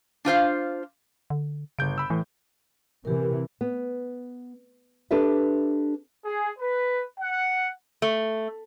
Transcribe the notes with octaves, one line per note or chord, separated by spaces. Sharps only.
D4 F4 C5 F5
D3
G1 C#3 G6 D7
B5 E6
A2 E3
C3 E3 G4 A#4
B3
D4 G4 A4 B4 D5 E5
G#4
B4
F#5
A3